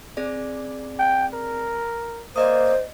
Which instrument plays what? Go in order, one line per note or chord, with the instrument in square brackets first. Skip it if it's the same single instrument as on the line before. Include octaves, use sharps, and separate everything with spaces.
[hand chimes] C4 G#4 D5
[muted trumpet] G5
A#4
[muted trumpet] A#3 [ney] C5 [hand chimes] D5 D#5 D#6